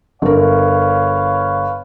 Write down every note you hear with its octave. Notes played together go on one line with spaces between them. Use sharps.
G1 A#4 B4 C#5 F5